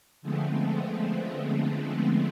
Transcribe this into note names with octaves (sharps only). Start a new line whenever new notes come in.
D3 F3 G#3 A3 B3 C4